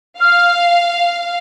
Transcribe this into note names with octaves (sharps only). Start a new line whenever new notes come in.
F5 F6